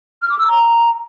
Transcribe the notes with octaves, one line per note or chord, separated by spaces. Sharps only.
F6
D6
E6
A#5